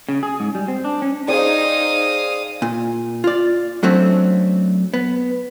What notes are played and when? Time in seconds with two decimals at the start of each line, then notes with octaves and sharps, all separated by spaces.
0.09 C#3
0.23 G#4
0.40 G#2
0.55 G3
0.68 C4
0.84 D4
1.02 C#4
1.28 D#4 G#4 C5 D5 F5 G5 C#6 D#6
2.62 A#2
3.24 F4 D5
3.83 F#2 F#3 A3 C4 D4
4.94 B3